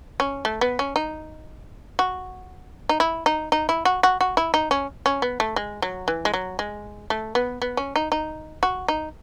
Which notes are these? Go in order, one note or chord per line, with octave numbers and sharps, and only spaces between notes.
C#4
A3
B3
C#4
D#4
F#4
D#4
E4
D#4
D#4
E4
F#4
F#4
F#4
E4
D#4
C#4
C#4
B3
A3
G#3
F#3
E3
G#3
F#3
G#3
A3
B3
B3
C#4
D#4
D#4
F#4
D#4